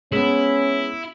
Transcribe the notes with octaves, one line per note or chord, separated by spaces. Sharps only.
G#3 B3 C#4 E4